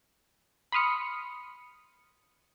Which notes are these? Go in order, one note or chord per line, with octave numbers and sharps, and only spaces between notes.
B5 C6 D#6 F6 C#7